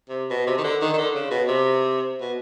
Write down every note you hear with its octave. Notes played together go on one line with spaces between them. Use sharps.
C3
B2
C3
D#3
D3
D#3
D#3
D3
C#3
B2
C3
B2